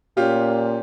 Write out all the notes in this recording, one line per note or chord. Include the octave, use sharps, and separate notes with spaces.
A#2 C#4 F4 G4